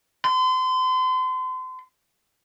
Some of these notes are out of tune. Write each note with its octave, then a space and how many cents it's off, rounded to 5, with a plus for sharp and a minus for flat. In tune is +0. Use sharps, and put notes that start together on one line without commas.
C6 -35